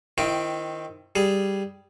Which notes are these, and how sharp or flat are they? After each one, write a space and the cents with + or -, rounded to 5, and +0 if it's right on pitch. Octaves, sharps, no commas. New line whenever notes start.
D#3 +5 C4 +0 E4 +35
G3 +0 G#4 +5